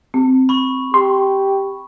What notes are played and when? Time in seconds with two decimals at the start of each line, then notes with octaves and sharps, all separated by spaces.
0.14 C4
0.49 B5 C#6
0.94 G4 C6